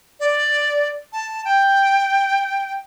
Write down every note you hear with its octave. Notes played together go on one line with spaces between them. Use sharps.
D5
A5
G5